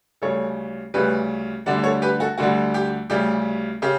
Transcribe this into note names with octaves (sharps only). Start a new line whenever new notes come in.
D2 C#3 G3 A4 C#5
D2 C#3 G3 G4 B4
D2 D3 G3 D5 F#5
A4 C#5
G4 B4
F#4 A4
D2 D3 G3 F#4
G4
D2 C#3 G3 G4
C#3 G4